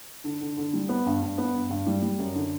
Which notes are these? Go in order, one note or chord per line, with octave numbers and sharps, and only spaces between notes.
D3
D3
D3
G3
B3
G2
G2
B3
G2
G2
G3
G3
F#2
D3